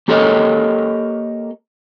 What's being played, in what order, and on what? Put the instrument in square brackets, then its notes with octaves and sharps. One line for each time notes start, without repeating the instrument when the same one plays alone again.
[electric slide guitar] A#3 G4 A4 A#4 C#5 D#5